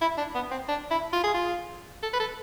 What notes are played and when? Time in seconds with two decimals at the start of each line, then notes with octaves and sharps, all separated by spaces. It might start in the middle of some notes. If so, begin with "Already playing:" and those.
0.01 E4
0.18 D4
0.35 B3
0.51 C4
0.68 D4
0.90 E4
1.13 F4
1.24 G#4
1.34 F4
2.03 A4
2.13 B4
2.20 A4